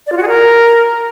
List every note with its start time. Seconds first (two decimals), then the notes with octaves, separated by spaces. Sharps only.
0.07 D5
0.12 F4
0.17 F#4
0.23 G#4
0.28 A#4